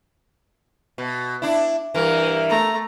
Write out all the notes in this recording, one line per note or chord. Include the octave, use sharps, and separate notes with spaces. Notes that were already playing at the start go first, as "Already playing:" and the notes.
B2
D4 E4
G2 E3 A#4
A3 A#5